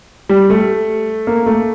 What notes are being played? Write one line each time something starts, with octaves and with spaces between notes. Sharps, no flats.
G3
A3
A#3
A3